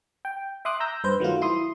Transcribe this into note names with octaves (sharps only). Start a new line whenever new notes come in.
G5
E5 C6 D6 D#6 F#6
A#5 E6 G6 A#6
G2 B4 C5 G6
D#3 F#3 A3 F4
E4 C6 D#6